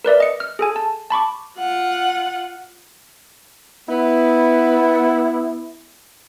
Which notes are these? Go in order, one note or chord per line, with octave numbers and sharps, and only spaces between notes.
A#4 B4 D5 E5
D#5 C#7
F6
G#4 A4 G#5
A5
A5 B5 C#6 D6
F4 F#5
B3 E4